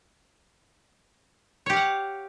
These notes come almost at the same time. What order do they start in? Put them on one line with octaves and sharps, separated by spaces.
C#5 G4 F5 F#5